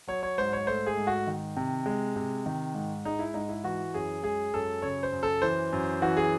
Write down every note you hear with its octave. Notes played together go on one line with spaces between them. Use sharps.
F#3 C#5
C#5
G#2 C5
C#5
A3 C5
G#4
G#2
F#4
D#3
C3
G#3
C3
D#3
G#2
G#3 D#4
E4
G#2 D#4
E4
E3 F#4
F#2 G#4
G#3 G#4
F#2 A4
C#3 C#5
C5
F#2
A4
E3 C5
F#2
E3 F#4
G#4